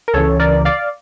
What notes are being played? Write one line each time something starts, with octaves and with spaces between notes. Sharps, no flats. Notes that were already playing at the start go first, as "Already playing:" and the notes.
A#4
C#2 C#3 E3 A4 C#5
A#4 D5
D5 F5